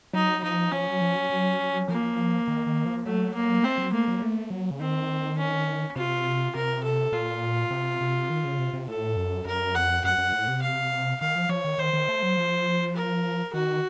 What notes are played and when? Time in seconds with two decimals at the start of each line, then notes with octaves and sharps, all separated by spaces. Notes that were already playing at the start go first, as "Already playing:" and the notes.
0.13 F#3 D#4
0.43 F3 D#4
0.72 F3 C#4
0.87 F#3
1.01 F3
1.16 F#3
1.30 F#3
1.88 F3 A#3
2.48 D#3
2.67 D#3
2.85 F3
3.05 F#3 A3
3.34 A#3
3.63 A3 C4
3.78 F#3
3.92 A3 A#3
4.08 F#3
4.22 A3
4.50 F#3
4.70 C#3
4.80 D#3 C4
5.38 C#4
5.96 C3 F4
6.55 C3 A#4
6.83 A4
7.12 A#2 F4
7.71 C3
8.01 C3
8.30 D#3
8.44 C#3
8.58 C3
8.73 C3
8.88 A2 A4
9.16 F#2
9.45 F#2 A#4
9.74 F2 F#5
10.04 F#2 F#5
10.18 F#2
10.33 A2
10.48 C3
10.62 F5
11.20 D#3 F5
11.36 F3
11.49 F3 C#5
11.64 D#3
11.78 D#3 C5
11.93 D#3
12.08 A3
12.23 F#3
12.37 F3
12.96 A#4
13.53 D#3 F#4